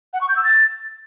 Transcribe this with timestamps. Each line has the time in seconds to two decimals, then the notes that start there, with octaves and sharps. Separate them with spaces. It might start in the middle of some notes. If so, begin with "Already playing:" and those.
0.13 F#5
0.21 C#6
0.29 G6
0.36 E6
0.44 A6